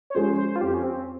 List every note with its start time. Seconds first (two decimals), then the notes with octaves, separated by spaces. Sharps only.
0.10 C#5
0.15 F3 G#3 C#4 G#4 C5
0.37 C5
0.56 F4
0.61 F2 G4
0.74 C#4
0.83 C4